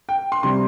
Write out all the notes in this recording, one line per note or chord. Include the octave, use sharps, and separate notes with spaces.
G5
C6
C3 G3 C6